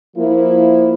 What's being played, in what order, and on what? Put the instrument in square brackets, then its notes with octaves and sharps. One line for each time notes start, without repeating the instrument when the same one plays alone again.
[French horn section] F3 A#3 E4